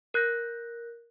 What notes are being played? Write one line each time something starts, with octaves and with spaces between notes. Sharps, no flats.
A#4 F#6 G6 A#6